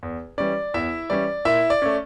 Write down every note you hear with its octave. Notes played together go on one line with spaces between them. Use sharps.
E2
E3 G3 C#4 D5
E2 E4 E5
E3 G3 C#4 D5
A#2 E4 E5
D5
A3 C#4